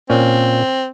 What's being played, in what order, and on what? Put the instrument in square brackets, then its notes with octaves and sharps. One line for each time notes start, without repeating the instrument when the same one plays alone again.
[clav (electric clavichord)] A#2 C#4 [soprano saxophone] C4